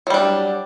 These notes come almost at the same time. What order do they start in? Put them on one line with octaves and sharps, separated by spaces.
F#3 G3 D4